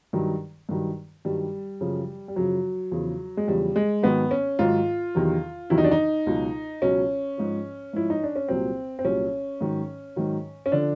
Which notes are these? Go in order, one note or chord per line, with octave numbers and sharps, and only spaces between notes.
G2 D#3 F#3
G2 D#3 F#3
G2 D#3 F#3 G3
F#2 C#3 F3
G3
F#2 C#3 F3 F#3
E2 C#3 F3
G#3
E2 C#3 F3 G3
G#3
G#2 D#3 F#3 B3
C#4
G#2 D#3 F#3 F4
E2 C3 D#3 F#3
E2 C3 D#3 F#3 E4
D#4
D4
D#4
C#2 B2 F#3
C#2 B2 F#3 C#4
G#2 F3
G#2 F3 E4
D#4
D4
C#4
C2 A#2 F#3 C4
C4
C2 A#2 F#3 C#4
G#2 D#3 F#3
G#2 D#3 F#3
C#4
D3 F3 D4